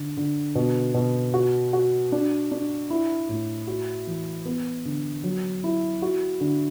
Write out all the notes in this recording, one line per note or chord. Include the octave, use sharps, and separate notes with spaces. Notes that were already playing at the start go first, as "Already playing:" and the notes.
Already playing: D3
D3
B2
B2
F#4
F#4
D4
D4
E4
A2
F#4
E3
B3
D3
F#3
E4
F#4
D3